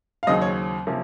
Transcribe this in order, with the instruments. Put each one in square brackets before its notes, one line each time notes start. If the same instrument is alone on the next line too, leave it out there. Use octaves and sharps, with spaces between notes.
[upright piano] F5
D#2 C#3 F#3 C4 D#5
C#5
C3 F3 A#3 C#4